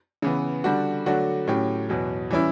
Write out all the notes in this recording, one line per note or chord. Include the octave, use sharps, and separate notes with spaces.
C#3 E3 B3
D3 G3 D4 F#4
D3 F#3 A3 D4 F#4
A2 F#3 C#4 G4
E2 B2 F#3
E3 G3 C#4 E4